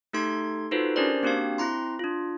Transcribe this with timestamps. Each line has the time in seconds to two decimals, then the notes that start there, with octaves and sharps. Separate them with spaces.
0.13 A3 D#4 G4 A4 C6 G#6
0.71 D#4 F4 F#4 A4 B4 C5
0.96 C#4 D4 G4 A#4 C5 D5
1.23 A#3 C4 D4 F#4 G4 F5
1.58 C4 E4 A#5 C6
1.99 D4 F4